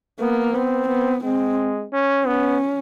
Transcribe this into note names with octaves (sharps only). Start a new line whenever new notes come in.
A#3 B3
B3 C4
B3
G#3 C4
C#4
B3 C#4